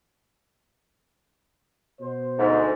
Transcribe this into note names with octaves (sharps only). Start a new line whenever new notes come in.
B2 C5
D2 G#2